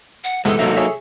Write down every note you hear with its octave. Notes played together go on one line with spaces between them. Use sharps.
F#5
E2 G#2 C3 G#3 A4
G#1 C3 F#3 A#3 D#4 E5
G#4 C#5 E5